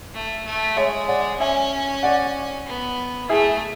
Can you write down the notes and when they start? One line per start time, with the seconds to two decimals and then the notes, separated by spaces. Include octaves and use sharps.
0.14 A3
0.45 A3
0.76 G#3 C#5 E5
1.08 D5 F#5
1.40 C#4 E5 G#5
2.03 D5 F#5
2.67 B3
3.29 A3 E4 G#4